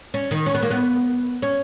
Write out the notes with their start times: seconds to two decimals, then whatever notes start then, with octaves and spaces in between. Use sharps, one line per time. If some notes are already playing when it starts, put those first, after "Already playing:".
0.14 C#4
0.31 D#3
0.46 C#4
0.54 B3
0.62 A#3
0.70 B3
1.42 C#4